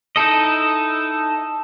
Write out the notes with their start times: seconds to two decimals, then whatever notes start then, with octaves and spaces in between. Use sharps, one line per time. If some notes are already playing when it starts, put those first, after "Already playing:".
0.16 D#4 E4 A4 D#5